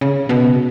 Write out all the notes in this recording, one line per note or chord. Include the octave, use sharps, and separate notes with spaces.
C#3
B2